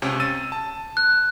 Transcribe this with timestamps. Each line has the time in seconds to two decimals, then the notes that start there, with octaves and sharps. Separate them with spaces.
0.02 C#2 C3 C#4
0.20 E6 A6 D#7
0.52 A5
0.97 F#6